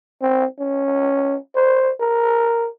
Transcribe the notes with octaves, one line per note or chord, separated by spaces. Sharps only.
C4
C#4
C5
A#4